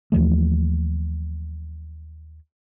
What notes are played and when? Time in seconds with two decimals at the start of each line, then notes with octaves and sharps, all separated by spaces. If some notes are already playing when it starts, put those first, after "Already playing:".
0.12 D#2 E3 F3 A3